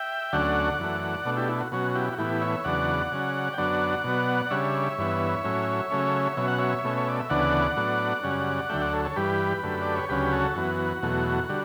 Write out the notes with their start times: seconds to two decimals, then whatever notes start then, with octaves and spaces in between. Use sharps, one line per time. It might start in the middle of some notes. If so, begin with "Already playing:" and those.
Already playing: E5 G5
0.33 D2 D3 F#3 A3 C#4 D5 F#5
0.79 F#2 E3 A3
1.25 B2 A3 D4
1.37 E4 G4
1.49 E4
1.61 F#4
1.72 B2 F#3 C#4 F#4
1.95 E4 G4
2.13 F#4
2.18 A2 E3 B3 E4 G4
2.41 C#5 E5
2.64 E2 C#3 F#3 B3 D4 D5 F#5
3.12 C#3 F#3 C#4
3.53 G5
3.58 F#2 D3 F#3 B3 D4 D5 F#5
4.04 B2 F#3 B3
4.46 D5
4.50 C#3 G3 D4 C#5 E5
4.98 G2 E3 B3
5.44 A2 F#3 C#4
5.91 C#3 F#3 A3 C#4
6.37 B2 F#3 C#4 E5
6.48 F#5
6.59 C#5 E5
6.84 B2 A3 C#4
6.98 C#5
7.08 D5
7.20 E5
7.30 D2 C#3 E3 B3 D4 D5 F#5
7.76 A2 F#3 B3 D4
8.23 F#2 C#3 G3 C#4
8.70 D2 D3 F#3 A3 E5 G5
8.81 D5 F#5
8.93 A4 C#5
9.05 A4 C#5
9.16 G2 E3 G3 G4 B4
9.63 F#2 D3 A3
9.82 D5
9.95 C#5
10.09 D2 C#3 F#3 C#4 G4 B4
10.25 B4
10.33 F#4 A4
10.55 F#2 E3 B3 F#4
11.03 E2 B2 F#3 A3
11.49 D3 G3